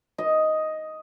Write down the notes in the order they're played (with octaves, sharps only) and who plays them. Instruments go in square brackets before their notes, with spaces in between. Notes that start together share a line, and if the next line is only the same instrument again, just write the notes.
[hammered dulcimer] D#5